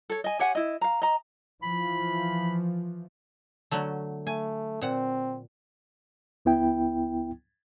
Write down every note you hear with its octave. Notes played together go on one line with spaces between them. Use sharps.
A4 C#5
D#5 G#5
G4 C#5 F#5 G#5
E4 D#5
F5 A#5
D#5 A#5
E3 F3 B5
D3 F#3 A3
A3 G#5
A#2 C4 F#5
C#2 B3 E4 G5